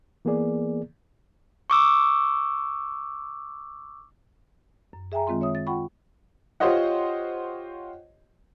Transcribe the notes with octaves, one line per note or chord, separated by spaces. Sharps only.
E3 A#3 B3 G#4 D5
C#6 D6 E6
F#2
G#4 E5 G5 G#5 A#5
D#3 G#3 C4 F4 C6
C#5 E5 D#6
A6
F4 F#5 G5 B5 C#6
F4 G4 C5 C#5 D#5 F#5